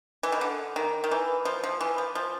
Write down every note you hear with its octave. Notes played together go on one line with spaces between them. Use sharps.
E3
D#3
D3
D#3
D#3
E3
F3
F3
E3
F3
F3